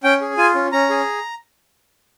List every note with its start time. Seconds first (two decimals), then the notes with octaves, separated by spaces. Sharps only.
0.04 C#4 G5
0.21 G#4
0.37 F4 G#5
0.55 C#4
0.72 C#4 A#5
0.90 G#4